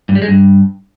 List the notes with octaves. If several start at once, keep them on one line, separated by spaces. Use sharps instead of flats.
G2
G3
G#3
G2